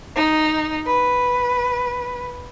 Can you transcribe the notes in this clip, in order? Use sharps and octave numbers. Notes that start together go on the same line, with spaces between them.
D#4
B4